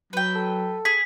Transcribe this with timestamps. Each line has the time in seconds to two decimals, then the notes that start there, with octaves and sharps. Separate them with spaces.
0.13 F#3 B4 G5
0.35 A4
0.85 G#4 B6